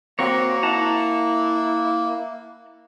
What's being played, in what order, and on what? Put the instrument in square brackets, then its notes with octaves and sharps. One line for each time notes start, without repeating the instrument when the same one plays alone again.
[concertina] A#3 [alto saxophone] C4 [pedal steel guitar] F#4 A#4 C#5
[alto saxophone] E4 [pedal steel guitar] F#5 A5 A#5